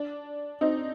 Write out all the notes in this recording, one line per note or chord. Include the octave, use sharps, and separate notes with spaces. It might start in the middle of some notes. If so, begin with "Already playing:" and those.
Already playing: D4
C4 D#4